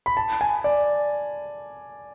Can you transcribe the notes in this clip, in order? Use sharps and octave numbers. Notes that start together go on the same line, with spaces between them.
B5
A5
G#5
D5